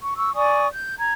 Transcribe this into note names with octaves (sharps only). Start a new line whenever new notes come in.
C#6
C#6 E6
D5 G#5 C#6 D#6
G6
A#5 G#6